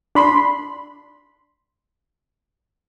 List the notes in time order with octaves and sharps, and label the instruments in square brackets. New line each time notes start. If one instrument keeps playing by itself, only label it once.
[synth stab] D4 B5 C6